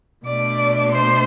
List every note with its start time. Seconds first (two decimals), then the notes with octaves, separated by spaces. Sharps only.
0.25 B2 A3 D4 D5 D6
0.92 C5 C6